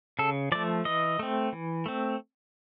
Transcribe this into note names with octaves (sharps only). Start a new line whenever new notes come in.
C#3 A4
F3 A3 D5
E3 D#5
A3 C4
E3
A3 C4